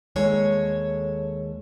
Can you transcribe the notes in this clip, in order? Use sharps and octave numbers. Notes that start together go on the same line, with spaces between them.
D#2 G#3 A4 C#5